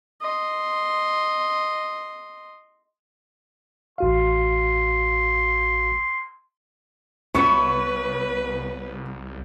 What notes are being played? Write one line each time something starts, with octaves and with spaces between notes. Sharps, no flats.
D#5 C6
A1 F#4 F5 C6
C2 B3 B4 C#5 E5 C#6